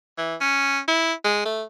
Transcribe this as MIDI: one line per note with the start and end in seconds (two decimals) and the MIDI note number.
0.18 0.35 52
0.41 0.79 61
0.88 1.13 64
1.24 1.41 56
1.45 1.63 57